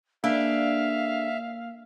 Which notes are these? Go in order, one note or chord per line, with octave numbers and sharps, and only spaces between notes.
A#3 D4 G#4 A4 E5 F5